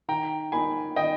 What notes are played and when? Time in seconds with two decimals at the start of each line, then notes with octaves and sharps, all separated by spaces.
0.08 D#3 G5 A#5
0.52 A#3 D#4 G#5 B5
0.96 D#3 D#5 G5